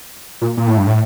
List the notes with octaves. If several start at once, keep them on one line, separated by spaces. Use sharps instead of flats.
A#2
A#2
A2
G2
A2